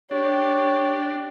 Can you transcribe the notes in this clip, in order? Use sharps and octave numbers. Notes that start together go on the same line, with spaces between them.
D4 G4 C#5